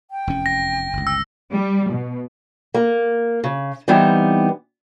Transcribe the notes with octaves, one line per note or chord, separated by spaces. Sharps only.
G5
F1 E2 C#4
A#6
G1 C#2
E6
G3
B2
A#3
C#3
E3 G3 B3 C4 D#4